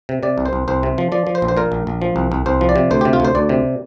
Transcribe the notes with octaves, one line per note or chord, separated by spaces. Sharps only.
C3
C3 D5
C2
C5
C2
C2 C5
C3
F3
F3 D5
F3
C5
A#1
C5
A#2 A#4
A#1
A#1
F3
C2
C2
C2 C5
F3
D5
C3
D2 C5
C3 G4
F4
D2 C5
D2 D5
C3